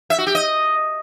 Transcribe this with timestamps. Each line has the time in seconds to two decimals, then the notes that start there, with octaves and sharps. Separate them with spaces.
0.10 E5
0.18 F#4
0.27 G4
0.35 D#5